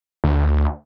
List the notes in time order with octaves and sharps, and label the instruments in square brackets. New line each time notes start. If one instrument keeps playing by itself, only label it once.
[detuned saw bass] D2